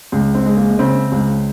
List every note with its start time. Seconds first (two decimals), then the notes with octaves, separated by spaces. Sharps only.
0.12 C#2
0.35 C4
0.46 G#3
0.56 A#3
0.79 C#3 C4
1.12 C#2